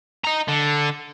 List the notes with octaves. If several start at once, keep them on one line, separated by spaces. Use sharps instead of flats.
D#5 A#5
D3